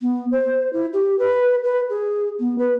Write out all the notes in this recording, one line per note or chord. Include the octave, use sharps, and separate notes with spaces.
B3
C5
E4
G4
B4
B4
G#4
B3
B4